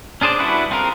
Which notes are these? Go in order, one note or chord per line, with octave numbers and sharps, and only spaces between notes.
C#4 D4 G#4 C5 D5
G3 D4 E4 F#4 B4
C4 F4 G#4 A#4